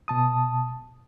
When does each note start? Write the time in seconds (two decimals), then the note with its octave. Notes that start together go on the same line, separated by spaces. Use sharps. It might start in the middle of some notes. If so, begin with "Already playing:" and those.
0.08 B2 A5 D#6